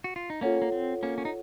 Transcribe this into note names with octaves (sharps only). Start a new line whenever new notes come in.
F#4
F4
D#4
A#3 C#4 F4 A4 C#5 F#5
A#3
C4
A#3 C#4
C#4
D#4